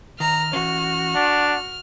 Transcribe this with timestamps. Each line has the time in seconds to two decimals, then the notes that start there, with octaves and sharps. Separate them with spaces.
0.20 D#3 A#5 F6
0.53 E3 C#4 F#4
1.15 D4 F#5